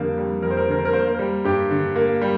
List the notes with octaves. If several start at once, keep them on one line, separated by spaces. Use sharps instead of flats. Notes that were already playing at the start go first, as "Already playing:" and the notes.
Already playing: F2 D3 G3 A#3
G3
F2 A#4
C5
A#4
C5
D3 A#4
C5
A#4
A#3 C5
A#4
C5
G3 A#4
G2 G4
D3
A#3
G3